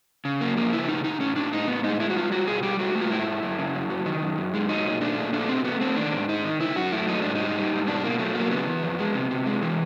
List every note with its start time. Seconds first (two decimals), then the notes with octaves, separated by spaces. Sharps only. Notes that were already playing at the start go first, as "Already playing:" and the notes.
0.25 C#3
0.41 F#2 A#3
0.57 F3 A#3
0.73 C#3 E4
0.88 A2 D#4
1.04 A2 D#4
1.20 A2 C#4
1.36 A2 D4
1.52 A2 D#4
1.68 A2 B3
1.84 G#3 D#4
2.00 G#3 E4
2.10 F#4
2.16 G3 F4
2.31 G3 F#4
2.47 B2 G#4
2.63 G3 G4
2.79 A3 F#4
2.95 A3
3.01 F4
3.11 G#2 E4
3.27 G#2
3.43 F#2
3.58 C#3
3.75 F#2
3.90 F#3
4.06 D#3
4.22 F#2
4.38 F#2
4.54 G#3
4.69 F#3 D#4
4.85 A#2
5.01 A3 D4
5.17 A#2
5.33 A3 D4
5.49 B2 C4
5.65 A3 B3
5.81 A3 C4
5.96 D#3 D4
6.13 G#2
6.29 G#2 D#4
6.44 D#3
6.60 C#3 E4
6.76 F#2 F#4
6.92 A3 E4
7.08 F#3 D#4
7.22 G#2 D4
7.35 G3 D#4
7.56 G3
7.71 G#2
7.87 B2 D4
8.03 B2 A#3
8.19 F#3 A3
8.35 F#3 A#3
8.51 C#3 B3
8.67 E3
8.83 F2
8.99 G#3
9.14 C3
9.31 C3
9.46 G#3
9.62 E3